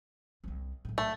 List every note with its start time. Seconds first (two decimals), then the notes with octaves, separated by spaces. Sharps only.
0.44 C2 C4
0.85 B1 A2
0.98 A3